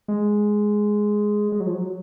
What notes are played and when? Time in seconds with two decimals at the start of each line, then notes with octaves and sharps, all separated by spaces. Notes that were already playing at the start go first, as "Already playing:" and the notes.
0.08 G#3
1.52 G#3
1.60 F#3
1.67 F3
1.74 F#3